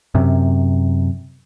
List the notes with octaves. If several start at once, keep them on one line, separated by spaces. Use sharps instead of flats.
F#2 C3